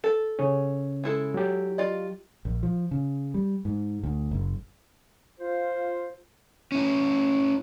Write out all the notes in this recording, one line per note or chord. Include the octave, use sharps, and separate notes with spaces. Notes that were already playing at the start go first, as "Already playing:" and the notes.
A4
C#3 C#4
G#3 E4 A4
F#3 G4
F4 D5 D#5
A#1
F3
C#3
G3
G#2
D2
F#1
F4 C5
C#4 E4